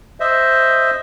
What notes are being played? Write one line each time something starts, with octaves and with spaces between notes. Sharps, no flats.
C5 D#5 E5